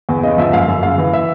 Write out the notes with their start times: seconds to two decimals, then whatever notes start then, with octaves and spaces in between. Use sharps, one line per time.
0.09 E2
0.23 C#3 D#5
0.38 F3 E5
0.53 F#2 F5
0.68 F#2
0.83 C#3 F5
0.98 E3
1.13 E5